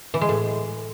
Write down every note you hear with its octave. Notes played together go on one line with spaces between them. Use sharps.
E3
G#3
A2